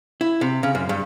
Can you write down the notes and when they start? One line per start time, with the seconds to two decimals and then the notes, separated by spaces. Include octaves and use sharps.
0.21 E4
0.41 C3
0.63 C#3
0.75 F#2
0.89 G2